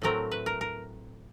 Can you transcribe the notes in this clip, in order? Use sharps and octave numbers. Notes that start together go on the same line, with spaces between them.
A2 F#3 A3 C4 A#4
B4
A#4
A#4